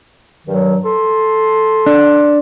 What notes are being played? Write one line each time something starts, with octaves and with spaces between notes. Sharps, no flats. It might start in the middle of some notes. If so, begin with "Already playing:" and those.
G2 D#3 F#3
A4 C6
D4